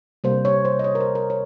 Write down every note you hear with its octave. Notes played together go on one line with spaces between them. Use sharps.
C3 G3 A#3 C5
C#5
C5
D#5
C#5
A#4
C5
A#4
C#5